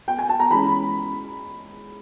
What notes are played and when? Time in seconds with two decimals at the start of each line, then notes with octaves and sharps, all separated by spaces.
0.08 G5
0.19 G#5
0.29 A5
0.40 A#5
0.50 E3 G#3 C#4 B5